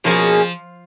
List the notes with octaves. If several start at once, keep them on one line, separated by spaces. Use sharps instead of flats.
B2 F3 A#3 C#4 G#4